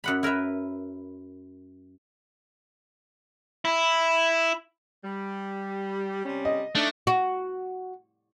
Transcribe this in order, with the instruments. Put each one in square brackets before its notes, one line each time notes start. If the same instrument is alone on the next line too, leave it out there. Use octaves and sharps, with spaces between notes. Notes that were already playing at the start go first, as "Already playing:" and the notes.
[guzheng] F#2 F#5 B5
E4 A#4 B4 E5
[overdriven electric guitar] E4
[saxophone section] G3
C3 G3 C#4
[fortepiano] D#5
[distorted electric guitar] A3 [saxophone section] D4 D#4
[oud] F#4